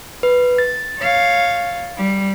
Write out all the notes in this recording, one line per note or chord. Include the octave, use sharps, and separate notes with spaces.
B4
A6
C#5 F5
G3